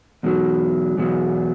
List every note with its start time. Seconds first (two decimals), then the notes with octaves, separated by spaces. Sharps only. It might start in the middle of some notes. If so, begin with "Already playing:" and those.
0.23 E2 B2 F#3
0.98 E2 B2 F#3